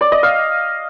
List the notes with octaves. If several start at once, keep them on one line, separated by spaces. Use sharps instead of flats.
D5
D#5
F5